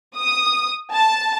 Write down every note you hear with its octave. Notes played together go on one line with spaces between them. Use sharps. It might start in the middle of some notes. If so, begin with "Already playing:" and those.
D#6
A5